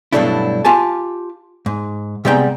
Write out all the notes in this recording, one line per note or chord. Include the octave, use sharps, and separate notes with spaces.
G2 B2 F#3 A3 D4 E4
F4 G4 G#5 A5
G#2
C3 G3 G#3 B3 G5 A#5